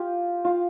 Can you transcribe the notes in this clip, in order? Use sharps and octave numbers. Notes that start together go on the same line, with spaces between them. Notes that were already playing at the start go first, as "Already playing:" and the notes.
Already playing: F4 G4
F4